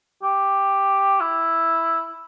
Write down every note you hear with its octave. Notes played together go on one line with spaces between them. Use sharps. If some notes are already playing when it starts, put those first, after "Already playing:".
G4
E4